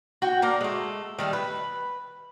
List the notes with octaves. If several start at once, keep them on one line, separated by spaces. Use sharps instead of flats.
F#4 G5
A#3 D4 A#4
G#3 A3
D#3 G3 A3
B4